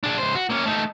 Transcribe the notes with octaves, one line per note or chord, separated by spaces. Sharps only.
D4 G#4
C#2 C5
F#4
A#3 C#4
A3 D#4